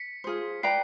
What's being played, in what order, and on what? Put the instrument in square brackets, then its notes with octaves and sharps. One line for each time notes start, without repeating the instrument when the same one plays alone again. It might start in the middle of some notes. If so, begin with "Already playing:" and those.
Already playing: [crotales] B6 C#7
[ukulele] F4 G#4 C5
[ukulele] B4 D5 G5 A#5 [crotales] C7